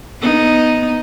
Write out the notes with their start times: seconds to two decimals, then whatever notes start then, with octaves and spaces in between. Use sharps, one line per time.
0.21 B3 D#4